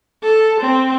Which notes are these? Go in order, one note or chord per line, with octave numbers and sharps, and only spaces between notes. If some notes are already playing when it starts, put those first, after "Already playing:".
A4
C4